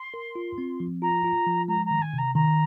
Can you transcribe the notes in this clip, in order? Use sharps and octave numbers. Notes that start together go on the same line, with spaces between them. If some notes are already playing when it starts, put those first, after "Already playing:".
Already playing: C6
A#4
F4
C4
F3
F4 A#5
F4
F3
G#3 A#5
A#5
D#3
G#5
C3 A#5
D#3 A#5